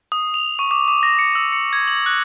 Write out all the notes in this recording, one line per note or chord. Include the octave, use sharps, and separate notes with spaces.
D#6
F7
C#6
D6
D6
A#6
C#7
E6
C#7
G#6
F#7
F#6